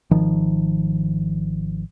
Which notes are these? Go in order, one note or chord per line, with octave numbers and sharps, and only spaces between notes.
G#1 D#3 F3